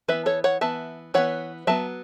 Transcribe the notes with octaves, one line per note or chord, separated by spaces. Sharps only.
E3 B3 B4 E5
A4 C#5
C#5 F#5
E3 B3 E5 A5
E3 B3 C#5 F#5
F#3 B3 E5 A5